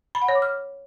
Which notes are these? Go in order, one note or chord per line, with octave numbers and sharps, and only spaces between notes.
B5
F#5
C#5
D6
F6